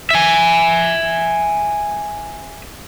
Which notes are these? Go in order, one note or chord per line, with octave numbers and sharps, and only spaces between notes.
E5 G#5